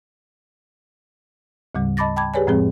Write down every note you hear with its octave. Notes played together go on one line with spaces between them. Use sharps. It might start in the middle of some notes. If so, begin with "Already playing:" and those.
D2 G#2 C#3 G3
D#5 A5 B5 D6 A6 A#6
G5 A5 B5 D6 G#6
G4 G#4 B4 C#5 D5 G#5
F2 A2 F3 G#3 C4 G#4